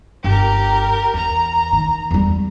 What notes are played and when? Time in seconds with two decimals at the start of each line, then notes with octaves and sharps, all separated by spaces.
0.24 G1 G4 A#4
1.14 E2 A#5
1.73 D#3
2.11 E2 G3